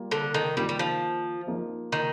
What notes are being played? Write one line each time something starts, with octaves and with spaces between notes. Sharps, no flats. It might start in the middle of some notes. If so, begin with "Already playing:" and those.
Already playing: G3 A#3 F4
D3
D#3
D#3 G3 A#3 F4
G3
F3
F3 A#3 D#4
D#3